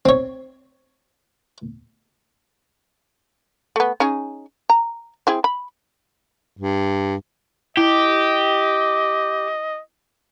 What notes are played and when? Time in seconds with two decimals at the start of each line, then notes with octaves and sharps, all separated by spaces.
0.05 C4 C#5
3.76 A3 B3
4.00 C#4 D#4 G#4
4.70 A#5
5.27 C4 E4 G#4
5.44 B5
6.58 G2
7.77 E4 G4 D#5